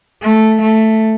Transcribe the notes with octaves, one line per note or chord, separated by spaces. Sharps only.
A3
A3